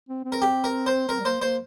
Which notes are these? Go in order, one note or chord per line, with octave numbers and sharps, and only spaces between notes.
C4
C4
A#4
G4
A#4
C5
C4 A#4
G3
A#3 C5
A#3 C5